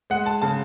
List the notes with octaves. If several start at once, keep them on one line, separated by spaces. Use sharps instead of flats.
G#3 F#5
A5
C#3 A5